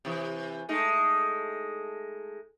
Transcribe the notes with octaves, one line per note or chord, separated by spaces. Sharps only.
C3 E3
G#3 A3 D#4